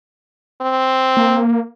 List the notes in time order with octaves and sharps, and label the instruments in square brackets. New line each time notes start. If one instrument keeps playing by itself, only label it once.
[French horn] C4
[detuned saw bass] A#3